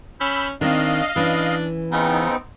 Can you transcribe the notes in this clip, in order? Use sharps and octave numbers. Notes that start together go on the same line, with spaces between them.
C#4 B5 E6 G6
D#3 C4 D4 D#5 F5
E3 C#4 D4
C#3 B3 C4 D#4